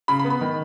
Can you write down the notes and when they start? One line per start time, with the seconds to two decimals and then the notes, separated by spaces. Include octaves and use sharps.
0.08 C#3 B5
0.19 B5
0.25 B3
0.30 B5
0.41 D#3